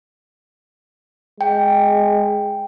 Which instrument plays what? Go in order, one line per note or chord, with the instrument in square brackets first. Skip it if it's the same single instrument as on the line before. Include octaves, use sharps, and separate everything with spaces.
[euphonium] G#3 [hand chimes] G5